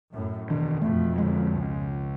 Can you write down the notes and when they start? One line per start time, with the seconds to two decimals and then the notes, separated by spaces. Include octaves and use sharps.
0.12 F#2 A2
0.50 E2 B2 D#3 D4
0.81 F2 B2 A3
1.18 D3 G#3
1.54 C#2